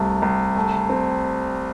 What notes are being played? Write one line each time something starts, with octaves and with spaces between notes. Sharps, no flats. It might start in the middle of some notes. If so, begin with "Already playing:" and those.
Already playing: C2 C3 A3
C2
A3
C4